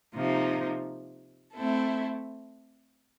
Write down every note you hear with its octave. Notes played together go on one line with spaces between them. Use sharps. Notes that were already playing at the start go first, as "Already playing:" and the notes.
C3 F3 A#3 D#4
A3 C4 E4 A4